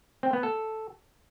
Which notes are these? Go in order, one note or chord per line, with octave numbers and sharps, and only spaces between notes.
C4
B3
A4